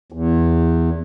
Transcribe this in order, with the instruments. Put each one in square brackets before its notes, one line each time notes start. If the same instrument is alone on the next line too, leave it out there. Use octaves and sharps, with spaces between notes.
[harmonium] E2